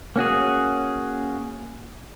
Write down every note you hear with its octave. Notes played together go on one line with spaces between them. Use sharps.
A#3 C#4 F#4 G#4